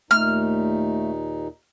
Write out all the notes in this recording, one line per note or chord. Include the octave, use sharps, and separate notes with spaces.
D#2 A#2 A3 D#4 F6